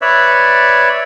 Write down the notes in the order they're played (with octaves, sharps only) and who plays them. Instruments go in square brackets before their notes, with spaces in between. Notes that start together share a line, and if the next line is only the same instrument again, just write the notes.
[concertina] B4 C#5 D5 E5